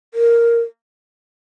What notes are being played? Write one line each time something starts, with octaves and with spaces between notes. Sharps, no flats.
A#4